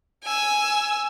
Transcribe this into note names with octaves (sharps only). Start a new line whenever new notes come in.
G#5 E6